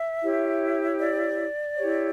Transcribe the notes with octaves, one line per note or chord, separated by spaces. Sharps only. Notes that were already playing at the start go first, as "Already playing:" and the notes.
Already playing: E5
E4 G4 C#5
D5
E4 G4 C#5